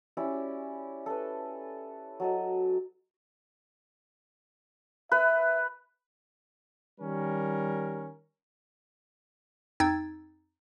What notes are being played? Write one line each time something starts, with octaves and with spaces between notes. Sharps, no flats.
C#4 E4 G4 D5
A4 B4
F#3 A4 D#5
B4 E5
D#3 G3 C#4 A#4
F2 D#4 G5 E6 G#6 A6